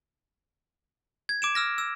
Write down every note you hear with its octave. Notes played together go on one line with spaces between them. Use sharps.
G#6
D6 D7 E7
E6 F6 A#6
E6